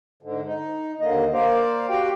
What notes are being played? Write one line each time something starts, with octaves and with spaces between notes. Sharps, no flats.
G#2 D3
D#4
D#2 D3 A#3 D#5
A#3 C5 D5 F5
F#4 G4 F5 G5